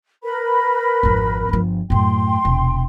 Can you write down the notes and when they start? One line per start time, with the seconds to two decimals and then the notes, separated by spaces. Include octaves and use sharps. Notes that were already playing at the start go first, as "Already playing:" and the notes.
0.23 A#4 B4 B5
1.03 G#1 F2
1.49 G1 F3
1.90 F#2 A2 G5 C6
2.45 E1 C3